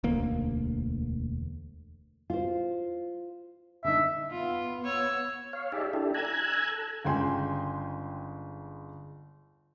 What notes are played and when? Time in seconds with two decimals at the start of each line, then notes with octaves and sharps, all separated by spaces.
0.04 E1 D2 A#3
2.30 F4 C5
3.84 D3 D#4 E5
4.31 B3 F4
4.84 C#5 E6
5.53 C#5 F5
5.72 D#4 G4 G#4 D5 E5
5.93 D4 E4 G4 A4
6.14 G#5 A#5 E6 F#6 G#6
6.72 A4
7.05 G1 C#3 G#3 G5 G#5 C6